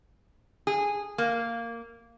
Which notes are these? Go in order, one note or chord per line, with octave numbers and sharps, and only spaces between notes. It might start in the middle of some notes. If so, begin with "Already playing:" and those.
G#4
A#3